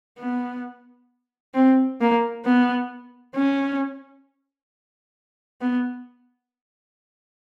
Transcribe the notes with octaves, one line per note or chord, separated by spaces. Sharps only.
B3
C4
A#3
B3
C#4
B3